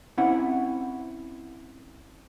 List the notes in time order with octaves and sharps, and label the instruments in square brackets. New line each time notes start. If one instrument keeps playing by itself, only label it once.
[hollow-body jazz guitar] C4 C#4 E4 F#5